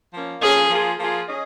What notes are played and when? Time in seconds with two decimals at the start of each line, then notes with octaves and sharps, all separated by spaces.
0.12 F3 A#3 C#4
0.42 F3 A#3 C#4 G#4
0.70 F3 A#3 F4 G#4
0.99 F3 A#3 F4 G#4
1.28 C#4 G#4 D#5